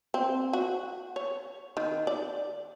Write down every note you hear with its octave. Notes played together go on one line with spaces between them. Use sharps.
C4
F#4
C#5
D#3
D5